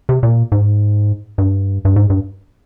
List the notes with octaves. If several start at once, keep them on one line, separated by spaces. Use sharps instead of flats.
C3
A#2
G#2
G2
G2
G#2
G2